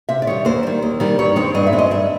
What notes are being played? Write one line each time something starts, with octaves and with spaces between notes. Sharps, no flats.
C3 E5
D5
D#3 G3 C#5
D#2 C5
D#3 G3
D#2
D#3 G3
G2 C#5
D#3 G#3 C4 C#5
G2 D#5
E5
D#3 G#3 C4
D#5
G2 E5